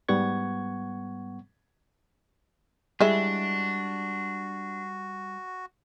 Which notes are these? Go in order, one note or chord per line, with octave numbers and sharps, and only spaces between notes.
G#2 G3 B3 F#5 C#6 G#6
G3 G#3 D4 E4 F#4